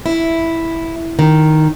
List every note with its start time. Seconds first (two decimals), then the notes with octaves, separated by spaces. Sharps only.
0.06 E4
1.19 D#3